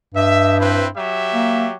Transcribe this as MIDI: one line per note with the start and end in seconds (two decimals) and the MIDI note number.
0.14 0.91 43
0.14 0.57 75
0.14 0.57 76
0.58 0.85 60
0.58 0.85 64
0.58 0.85 71
0.95 1.74 54
0.95 1.74 67
0.95 1.74 76
1.34 1.67 58